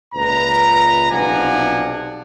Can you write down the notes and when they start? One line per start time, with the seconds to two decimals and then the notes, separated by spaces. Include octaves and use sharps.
0.15 C#2 A#2 B4 A#5
1.11 B1 C3 F3 D4 F#5 G#5